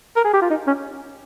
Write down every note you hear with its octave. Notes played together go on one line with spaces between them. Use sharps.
A#4
G#4
G4
F4
D#4
C#4